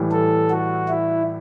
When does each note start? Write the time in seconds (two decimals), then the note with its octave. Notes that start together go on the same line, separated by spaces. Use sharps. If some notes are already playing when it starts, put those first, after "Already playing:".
Already playing: A2 E3 G3
0.11 A4
0.50 F#4
0.88 E4